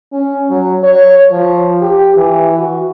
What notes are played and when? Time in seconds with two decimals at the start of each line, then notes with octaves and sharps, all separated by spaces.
0.12 C#4
0.50 F#3
0.83 C#5
1.32 F3
1.82 G4
2.16 E3
2.58 F#4